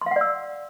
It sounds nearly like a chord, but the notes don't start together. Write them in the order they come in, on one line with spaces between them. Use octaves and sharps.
C6 F5 F#5 D5 E6